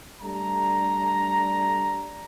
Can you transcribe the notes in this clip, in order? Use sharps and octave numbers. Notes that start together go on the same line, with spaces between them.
G3 A3 D4 A#5